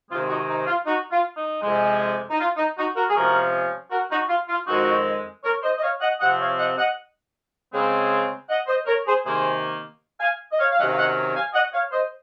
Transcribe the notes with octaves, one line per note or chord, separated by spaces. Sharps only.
C3 D#3 G#3 C4 F4
D#4 F#4
D#4
F4
D#4 F#4
F4
D#4
F2 C3 F3 G#3
D#4
F4
D#4
D#4 F#4
F#4 A#4
G#4
C3 F3 G#3 C#4 F#4 A#4
F#4 A#4
D#4 F#4
F4
F4
F2 D#3 G#3 C4 D#4 F#4
A#4 C#5
C5 D#5
D#5
C#5 F5
D#5 F#5
C3 F3 C4 D#5 F#5
C#5 F5
D#5 F#5
D#5 F#5
C#3 G#3 C4
D#5 F#5
C5 D#5
A#4 C#5
G#4 C5
C3 D#3 A#3 G#4 C5
F5 G#5
D#5
C#5 F5
F5
C3 D#3 F#3 C#4 D#5 F#5
F5
D#5 F#5
F5 G#5
D#5 F#5
C#5 F5
C5 D#5